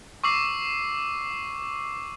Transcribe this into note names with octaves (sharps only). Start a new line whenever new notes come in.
C#6 D6 E6 C7